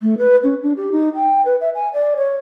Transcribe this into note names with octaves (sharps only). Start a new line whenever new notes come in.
A3
B4
C#4
D4
G4
D#4
G5
B4
E5
G#5
D5
C#5